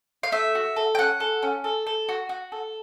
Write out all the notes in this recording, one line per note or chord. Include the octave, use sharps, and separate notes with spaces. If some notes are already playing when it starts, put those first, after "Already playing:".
F5
A3 E5
F#4
A4
G5
C#4 F#5
A4
C#4
A4
A4
F#4
F#4
A4